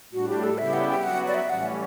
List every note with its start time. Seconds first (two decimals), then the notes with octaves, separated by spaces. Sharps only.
0.13 A2 G3 D4 F#4
0.29 G4
0.43 A4
0.58 C#3 G3 B3 E4 G4 E5
0.73 F#5
0.88 G5
1.03 F#3 B3 F#4 F#5
1.28 D5
1.34 E5
1.49 A2 E3 G3 C#4 F#5